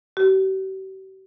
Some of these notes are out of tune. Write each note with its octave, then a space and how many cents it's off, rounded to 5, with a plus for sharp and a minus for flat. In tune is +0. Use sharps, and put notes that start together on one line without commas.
G4 -45